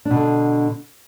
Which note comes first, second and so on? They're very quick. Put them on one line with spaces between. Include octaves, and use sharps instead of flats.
D4 B2 D3